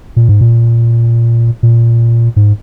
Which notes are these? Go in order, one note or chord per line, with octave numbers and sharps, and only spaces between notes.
A#2
G#2
A#2
A#2
G#2